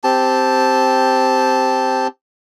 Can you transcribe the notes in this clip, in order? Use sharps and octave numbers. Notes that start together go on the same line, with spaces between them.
C4 G4 A5